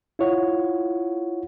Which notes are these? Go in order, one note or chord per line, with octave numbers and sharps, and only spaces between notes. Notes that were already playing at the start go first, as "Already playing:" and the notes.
E4 F4 C#5 F#5